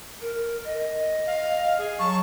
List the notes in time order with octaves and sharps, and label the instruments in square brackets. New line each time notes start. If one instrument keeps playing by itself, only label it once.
[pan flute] A#4
D#5
[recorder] F5
G#4
[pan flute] F#3 [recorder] A5 [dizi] C#6